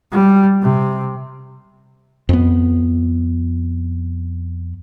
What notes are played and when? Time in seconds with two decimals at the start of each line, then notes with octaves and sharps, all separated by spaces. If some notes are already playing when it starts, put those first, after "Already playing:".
0.12 G3
0.63 C3
2.29 F2 B3